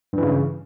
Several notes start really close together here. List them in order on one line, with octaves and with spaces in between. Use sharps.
G2 E3 C#3